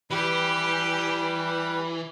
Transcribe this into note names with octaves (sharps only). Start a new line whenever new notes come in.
E3 G3 G4 B4